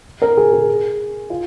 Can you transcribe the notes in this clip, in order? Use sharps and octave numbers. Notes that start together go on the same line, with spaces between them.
A#4
G#4
G#4
F4